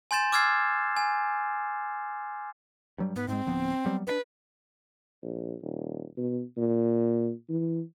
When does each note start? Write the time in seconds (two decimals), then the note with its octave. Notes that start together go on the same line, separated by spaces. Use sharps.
0.11 G#5 C6 G6 A6 E7
0.32 D6 E6 F6 G#6 A6 C7
0.96 G#5
2.98 G2 F#3 G3
3.16 G#2 B3
3.28 G#2 G#3 C4
3.46 D1 F3 B3
3.85 F#3 G3 B3
4.07 G2 D4 B4
5.22 A#1
5.62 D#1
6.17 B2
6.57 A#2
7.49 E3